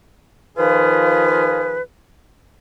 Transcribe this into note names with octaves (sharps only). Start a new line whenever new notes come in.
D#3 F3 F4 G#4 B4